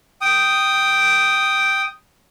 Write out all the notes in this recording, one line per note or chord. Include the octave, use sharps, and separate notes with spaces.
G5 D#6